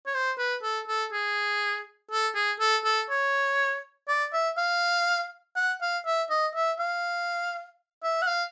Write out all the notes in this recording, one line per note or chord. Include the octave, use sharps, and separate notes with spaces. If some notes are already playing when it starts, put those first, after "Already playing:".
C#5
C5
B4
A4
A4
G#4
A4
G#4
A4
A4
C#5
D5
E5
F5
F#5
F5
E5
D#5
E5
F5
E5
F#5
F5